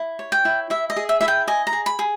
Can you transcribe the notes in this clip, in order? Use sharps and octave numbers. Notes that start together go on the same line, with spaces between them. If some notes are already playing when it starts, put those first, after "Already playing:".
Already playing: E4
C#5
G5
E4
E4 E5
D#5
G#4
E5
E4 E5
G5
D#5 G#5
A#5
G#4
B5
G#4